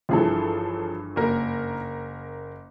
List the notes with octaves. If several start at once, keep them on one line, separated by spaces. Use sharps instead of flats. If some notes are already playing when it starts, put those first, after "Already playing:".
G1 G2 E3 F3 G#4 A4
F#1 A#4